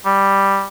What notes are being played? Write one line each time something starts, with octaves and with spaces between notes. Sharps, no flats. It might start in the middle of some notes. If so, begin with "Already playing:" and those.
G3